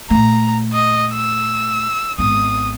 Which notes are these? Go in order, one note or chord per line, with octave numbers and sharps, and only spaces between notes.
A#2 A3 A#5
D#5
E6
G#1 B3 D#6